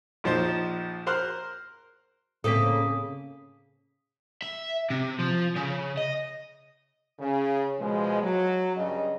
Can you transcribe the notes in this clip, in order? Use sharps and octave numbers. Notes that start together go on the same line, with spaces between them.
A#1 F3 D#4 C5
A#4 C5 C6 F6 F#6
A2 C#3 A#3 C4 A4 D#6 B6
E5
C3
F3
C#3
D#5
C#3
B2 F3 G#3
F#3
G2 C#3 D#5